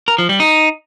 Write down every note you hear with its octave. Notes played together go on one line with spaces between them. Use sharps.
A#4
F3
G3
D#4